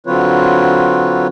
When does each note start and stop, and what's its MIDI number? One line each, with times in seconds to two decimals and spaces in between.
0.07 1.27 50
0.07 1.27 54
0.07 1.27 60
0.07 1.27 65
0.07 1.27 71
0.07 1.27 73